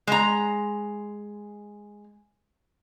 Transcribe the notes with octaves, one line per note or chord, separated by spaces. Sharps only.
G#3 A#5